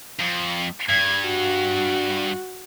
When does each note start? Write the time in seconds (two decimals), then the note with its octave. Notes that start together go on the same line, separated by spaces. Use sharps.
0.20 F2
0.89 G2 G#6
1.26 F#4